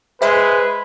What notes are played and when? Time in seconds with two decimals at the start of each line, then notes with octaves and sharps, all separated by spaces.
0.22 G#3 B4 C5 E5 B5